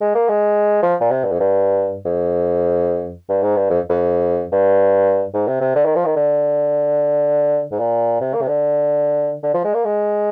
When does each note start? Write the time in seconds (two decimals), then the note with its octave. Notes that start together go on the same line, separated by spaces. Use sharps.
0.01 G#3
0.15 A#3
0.29 G#3
0.83 F3
1.01 A#2
1.10 C3
1.24 G2
1.32 F2
1.40 G2
2.05 F2
3.29 G2
3.42 G#2
3.56 G2
3.70 F2
3.89 F2
4.52 G2
5.34 G#2
5.47 C3
5.61 C3
5.75 D3
5.85 D#3
5.95 F3
6.05 D#3
6.16 D3
7.71 G#2
7.79 A#2
8.21 C3
8.34 A#3
8.42 C3
8.48 D3
9.43 D3
9.54 F3
9.64 G#3
9.74 A#3
9.85 G#3